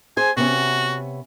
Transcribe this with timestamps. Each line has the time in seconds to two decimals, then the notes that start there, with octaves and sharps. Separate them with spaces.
0.17 G#4 C5 G#5
0.37 C3 B3 C#4 F#4